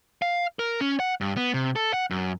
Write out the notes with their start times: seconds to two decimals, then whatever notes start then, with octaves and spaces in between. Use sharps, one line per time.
0.22 F5
0.59 A#4
0.81 C#4
1.00 F#5
1.21 G2
1.37 B3
1.54 C3
1.76 A4
1.94 F#5
2.11 F#2